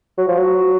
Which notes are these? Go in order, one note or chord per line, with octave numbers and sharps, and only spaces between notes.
F#3
F3
F#3